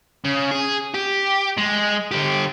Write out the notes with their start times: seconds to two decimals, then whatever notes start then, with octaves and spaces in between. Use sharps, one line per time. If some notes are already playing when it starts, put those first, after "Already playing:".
0.24 C#3
0.51 G#4
0.94 G4
1.58 G#3
2.11 D3 G4